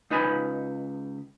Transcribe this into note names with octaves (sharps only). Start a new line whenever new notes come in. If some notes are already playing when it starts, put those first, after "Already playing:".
C#2 D#4 B4 G#5 A5 B5